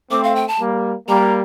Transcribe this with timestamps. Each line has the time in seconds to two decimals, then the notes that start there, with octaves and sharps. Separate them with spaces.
0.11 A3 C4 D6
0.24 F5
0.36 G5
0.48 A5
0.60 G3 A#3
1.08 G3 A#3 A#5